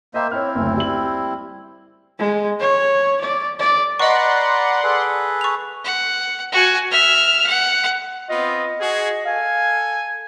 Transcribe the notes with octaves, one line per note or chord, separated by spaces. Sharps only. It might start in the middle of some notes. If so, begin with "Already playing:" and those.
A#3 C5 D#5 E5 G5 B5
C4 E4 C#5 F6
F#1 D2
G3 F#7
G#3
C#5
D5
D5
B4 D5 D#5 F#5 A#5 C6 C#6
G#4 A4 B4
C#6 F7
F#5
F#4 G#5
E5 F6
F#5
B3 C4 F4 D#5
F#4 G#4
A4 F5 G#5